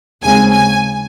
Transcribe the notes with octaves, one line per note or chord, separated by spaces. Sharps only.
D#2 C#3 G#3 C4 G#5
G#5